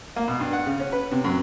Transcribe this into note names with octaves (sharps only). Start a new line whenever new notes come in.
A#3
B2
G2
F#5
C#3
C#4
B4
C3
F#2